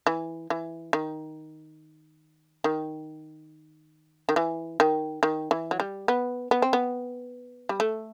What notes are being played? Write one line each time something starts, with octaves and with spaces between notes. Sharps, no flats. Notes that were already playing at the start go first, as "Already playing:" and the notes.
E3
E3
D#3
D#3
D#3
E3
D#3
D#3
E3
F#3
G3
B3
B3
C4
B3
G3
A3